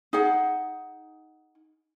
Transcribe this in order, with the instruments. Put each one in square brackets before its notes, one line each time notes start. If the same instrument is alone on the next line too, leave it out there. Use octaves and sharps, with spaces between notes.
[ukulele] D#4 G#4 F#5